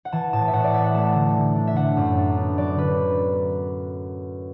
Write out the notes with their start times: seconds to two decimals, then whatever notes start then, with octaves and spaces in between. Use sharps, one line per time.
0.05 F#5
0.13 E3 A5
0.33 A2 A5
0.48 E5
0.53 A2 F#5
0.64 D5
0.74 B3 E5
0.84 F#5
0.94 A3 A5
1.15 D3
1.36 D3
1.56 D4
1.67 E5
1.76 D3 F#5
1.97 F#2
2.17 D4
2.37 B3
2.58 F#3 D5
2.78 D3 B4